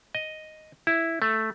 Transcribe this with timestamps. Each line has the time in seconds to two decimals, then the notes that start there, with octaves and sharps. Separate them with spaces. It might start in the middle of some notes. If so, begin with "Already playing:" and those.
0.15 D#5
0.87 E4
1.22 A3